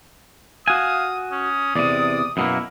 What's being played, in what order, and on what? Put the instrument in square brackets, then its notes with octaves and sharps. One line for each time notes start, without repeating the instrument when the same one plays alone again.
[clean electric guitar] F#4 G#5 [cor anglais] F5 [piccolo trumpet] D#6
[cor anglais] C#4 [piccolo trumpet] D#6
[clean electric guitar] E2 C3 [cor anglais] D5
[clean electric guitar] F#2 B2 A#3 [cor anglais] E4